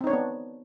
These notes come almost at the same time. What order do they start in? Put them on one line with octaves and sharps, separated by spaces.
C4 D#4 C#5 D4 B3